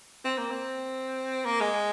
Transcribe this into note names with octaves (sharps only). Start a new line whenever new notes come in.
C4
A#3
C4
A#3
G#3